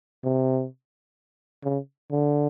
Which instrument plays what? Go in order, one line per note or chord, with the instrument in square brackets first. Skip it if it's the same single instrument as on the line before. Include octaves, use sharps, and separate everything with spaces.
[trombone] C3
C#3
D3